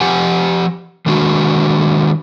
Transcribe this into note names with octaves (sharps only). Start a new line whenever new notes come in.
F3 G4 F#5 G#5
D#3 G#3 D4 F#4